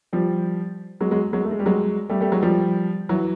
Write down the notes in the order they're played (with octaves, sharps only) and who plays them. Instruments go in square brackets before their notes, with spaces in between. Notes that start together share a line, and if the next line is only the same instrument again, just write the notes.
[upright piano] F3 G3
F#3 G#3
F#3 G#3
F#3 G#3
A3
G#3
G3
F#3 G#3
G3 A3
G3 A3
F#3 G#3
F3 G3
E3 F#3